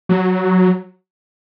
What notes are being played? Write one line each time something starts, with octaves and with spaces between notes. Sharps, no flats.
F#3